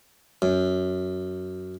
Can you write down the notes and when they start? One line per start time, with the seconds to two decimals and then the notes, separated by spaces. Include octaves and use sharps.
0.42 F#2